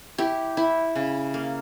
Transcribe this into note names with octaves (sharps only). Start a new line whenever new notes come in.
E4 G4
E4
C#3
A#3